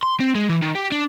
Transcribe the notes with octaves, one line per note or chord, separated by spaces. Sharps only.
C6
C4
G#3
E3
D#3
G4
D4